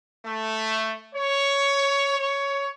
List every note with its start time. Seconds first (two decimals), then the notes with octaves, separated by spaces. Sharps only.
0.24 A3
1.14 C#5
2.18 C#5